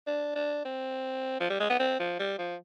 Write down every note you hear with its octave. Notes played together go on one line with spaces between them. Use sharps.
D4
D4
C4
F3
G3
G#3
B3
C4
F3
G3
F3